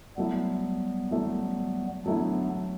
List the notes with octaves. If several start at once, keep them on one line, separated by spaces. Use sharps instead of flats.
F#3 G3 A3 B3 E4
F#3 A3 E4
F#3 A3 B3 D4 E4